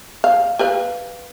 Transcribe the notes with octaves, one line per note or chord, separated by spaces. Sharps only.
F5
G4 B4 F5